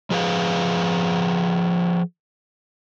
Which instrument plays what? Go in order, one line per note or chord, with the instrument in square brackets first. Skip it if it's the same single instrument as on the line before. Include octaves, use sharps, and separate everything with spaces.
[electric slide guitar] F3 G#4 B4 F5